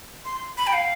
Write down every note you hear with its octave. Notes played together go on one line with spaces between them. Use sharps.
C6
B5
G5
F5